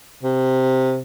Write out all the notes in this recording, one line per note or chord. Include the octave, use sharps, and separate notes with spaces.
C3